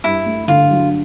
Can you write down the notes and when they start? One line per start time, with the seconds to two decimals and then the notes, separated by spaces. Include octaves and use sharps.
0.04 G2 E4
0.26 A3
0.48 D3 F4
0.70 F#3